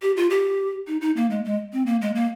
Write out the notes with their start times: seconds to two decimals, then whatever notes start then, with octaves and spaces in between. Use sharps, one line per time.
0.02 G4
0.17 F4
0.30 G4
0.87 D#4
1.01 D#4
1.16 A#3
1.30 G#3
1.45 G#3
1.73 C4
1.86 A#3
2.01 G#3
2.15 A#3